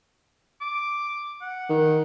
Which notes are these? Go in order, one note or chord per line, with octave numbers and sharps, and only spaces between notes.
D6
F#5
D#3